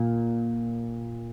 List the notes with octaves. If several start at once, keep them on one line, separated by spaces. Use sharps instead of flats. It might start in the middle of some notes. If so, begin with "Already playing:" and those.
Already playing: A#2